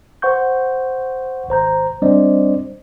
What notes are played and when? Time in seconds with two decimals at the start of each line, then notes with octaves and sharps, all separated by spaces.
0.22 C5 F#5 C#6 G6
1.49 G#1 C5 A#5 G6
2.02 G3 C4 D4 C5 D5 D#5